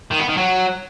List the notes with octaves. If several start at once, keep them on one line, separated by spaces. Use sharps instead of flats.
D#3
B3
D#3
F#3